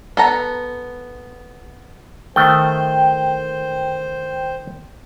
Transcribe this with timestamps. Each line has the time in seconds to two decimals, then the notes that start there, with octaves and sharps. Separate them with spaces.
0.17 B3 A4 A#5
2.36 D#3 A3 C5 G5